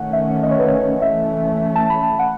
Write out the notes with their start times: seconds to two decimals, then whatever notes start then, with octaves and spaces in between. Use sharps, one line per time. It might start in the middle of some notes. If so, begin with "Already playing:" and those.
Already playing: D#3 A3 C#4 F#5
0.13 E5
0.43 D#5
0.51 C#5
0.59 B4
0.68 C#5
1.01 E3 A3 C#4 E5
1.76 A5
1.90 B5
2.04 A5
2.19 F#5